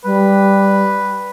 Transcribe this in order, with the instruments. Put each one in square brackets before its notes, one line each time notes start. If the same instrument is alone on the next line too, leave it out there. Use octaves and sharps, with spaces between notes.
[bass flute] G3 [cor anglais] B4